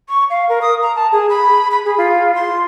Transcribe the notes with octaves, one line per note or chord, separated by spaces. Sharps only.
C#6
F5
A#4
D#6
A#5
A5
G#4
B5
B5
G#4
F4
C6